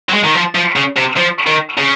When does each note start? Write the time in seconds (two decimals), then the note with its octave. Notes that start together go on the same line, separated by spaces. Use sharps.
0.09 F#3
0.14 G#3
0.24 D#3
0.35 F3
0.55 F3
0.76 C#3
0.96 C3
1.16 F3
1.47 D#3
1.77 C#3